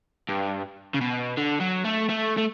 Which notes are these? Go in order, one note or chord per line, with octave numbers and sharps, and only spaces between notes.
G2
C#3
B2
D3
F#3
A3
A3
A3